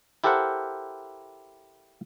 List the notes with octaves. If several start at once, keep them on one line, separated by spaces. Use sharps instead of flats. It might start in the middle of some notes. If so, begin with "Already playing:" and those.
E4 G4 A4 A#4 C5 F#5